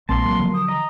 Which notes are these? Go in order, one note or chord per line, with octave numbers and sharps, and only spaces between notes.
A#1 G#3 A#3 C4 A5 C6
F#3
D3 F3
D#6
D#5 A#5